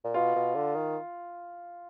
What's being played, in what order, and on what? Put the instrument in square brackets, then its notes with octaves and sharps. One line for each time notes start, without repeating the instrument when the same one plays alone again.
[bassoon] A#2
[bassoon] B2 [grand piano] F4
[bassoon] B2
D3
D#3